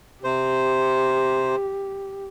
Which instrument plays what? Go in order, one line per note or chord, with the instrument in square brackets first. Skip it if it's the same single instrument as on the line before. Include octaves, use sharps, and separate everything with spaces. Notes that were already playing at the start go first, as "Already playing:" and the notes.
[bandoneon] C3 C5 [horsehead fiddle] G4